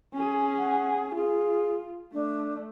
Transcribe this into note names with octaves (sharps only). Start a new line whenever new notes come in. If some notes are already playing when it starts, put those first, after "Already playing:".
C#4 G#4
F#5
F4 G#4
A3 D4